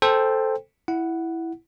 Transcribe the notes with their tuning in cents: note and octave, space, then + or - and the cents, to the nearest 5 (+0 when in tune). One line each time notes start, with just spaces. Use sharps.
A4 +0 C5 +0 G5 +20
E4 +0 F#5 +0